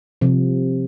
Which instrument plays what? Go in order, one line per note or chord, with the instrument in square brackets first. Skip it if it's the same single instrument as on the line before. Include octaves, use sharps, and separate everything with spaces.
[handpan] C3 F3